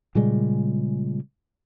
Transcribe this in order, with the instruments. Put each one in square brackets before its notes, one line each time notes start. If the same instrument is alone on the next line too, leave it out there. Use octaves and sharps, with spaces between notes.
[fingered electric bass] A#2 C#3 G3 G#3